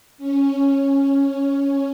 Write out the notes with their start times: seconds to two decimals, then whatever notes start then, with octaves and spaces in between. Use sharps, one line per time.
0.18 C#4
0.72 C#4